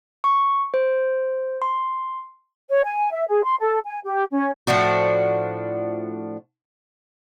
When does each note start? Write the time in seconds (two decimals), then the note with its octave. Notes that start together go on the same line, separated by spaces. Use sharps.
0.24 C#6
0.74 C5
1.62 C6
2.70 C#5
2.84 G#5
3.12 E5
3.28 G#4
3.44 C6
3.59 A4
3.85 G#5
4.04 G4
4.31 C#4
4.67 A2 F3 D4 F#4